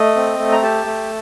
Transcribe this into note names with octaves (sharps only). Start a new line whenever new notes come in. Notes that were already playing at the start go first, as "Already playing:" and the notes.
Already playing: A3 D#5
C4
A3
A#5
G4 A5
A3